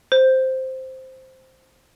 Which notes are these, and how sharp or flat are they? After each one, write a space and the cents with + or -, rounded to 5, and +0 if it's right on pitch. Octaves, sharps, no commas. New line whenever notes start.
C5 +0